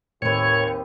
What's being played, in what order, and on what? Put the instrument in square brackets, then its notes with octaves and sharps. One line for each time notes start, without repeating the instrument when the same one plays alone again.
[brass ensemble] D#2 [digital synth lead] A2 [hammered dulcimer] C4 B4 [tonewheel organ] C#5